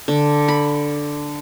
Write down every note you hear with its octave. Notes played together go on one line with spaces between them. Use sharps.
D3
B5